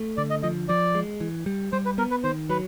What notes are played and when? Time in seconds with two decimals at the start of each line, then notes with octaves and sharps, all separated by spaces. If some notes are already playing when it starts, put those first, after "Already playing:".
Already playing: A3
0.17 D3 D5
0.30 D#5
0.43 F3 D#5
0.68 F3 D5
0.95 G#3
1.21 E3
1.46 G3
1.72 G3 C5
1.85 B4
1.98 B3 A#4
2.11 B4
2.24 D#3 C5
2.50 F#3 B4